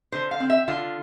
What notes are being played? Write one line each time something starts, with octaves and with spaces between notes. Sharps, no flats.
D3 C5
F5
C4
E5
D3 F4